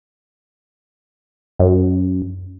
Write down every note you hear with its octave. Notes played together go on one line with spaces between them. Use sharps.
F#2